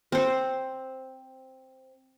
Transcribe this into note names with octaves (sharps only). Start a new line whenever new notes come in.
C4 C5